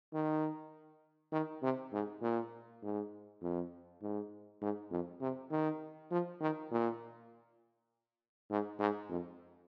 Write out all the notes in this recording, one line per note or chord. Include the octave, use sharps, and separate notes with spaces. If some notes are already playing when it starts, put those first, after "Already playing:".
D#3
D#3
C3
G#2
A#2
G#2
F2
G#2
G#2
F2
C3
D#3
F3
D#3
A#2
G#2
G#2
F2